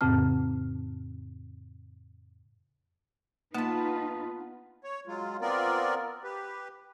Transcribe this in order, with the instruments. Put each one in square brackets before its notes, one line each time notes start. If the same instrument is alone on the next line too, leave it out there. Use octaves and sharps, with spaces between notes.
[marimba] F2 A2 C#3 C4 A5 F6
[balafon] A#3 [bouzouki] B3 A5 [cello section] D#4 F4 B4
[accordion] C#5
F#3 G#3 F4
B3 C4 F4 A#4 D5
G4 B4